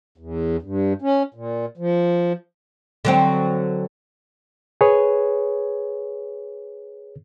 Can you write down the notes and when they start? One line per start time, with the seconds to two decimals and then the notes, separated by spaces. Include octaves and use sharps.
0.18 E2
0.62 G2
1.02 C#4
1.34 A#2
1.77 F3
3.05 D3 F#3 C4
4.81 G#4 B4 C#5